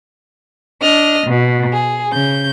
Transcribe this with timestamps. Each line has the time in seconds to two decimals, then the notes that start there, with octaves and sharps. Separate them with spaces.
0.81 D4 D#5 F6
1.27 B2
1.73 G#4
2.12 C#3 G6